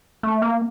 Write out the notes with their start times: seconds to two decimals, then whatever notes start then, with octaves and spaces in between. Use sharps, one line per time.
0.23 A3
0.42 A#3